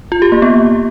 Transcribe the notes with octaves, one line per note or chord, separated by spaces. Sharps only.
F4
G4
A#3
B3